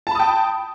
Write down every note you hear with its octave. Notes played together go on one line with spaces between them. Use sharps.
G5 A5 B5 D#6